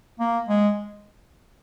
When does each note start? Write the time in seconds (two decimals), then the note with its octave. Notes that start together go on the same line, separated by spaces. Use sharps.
0.19 A#3
0.49 G#3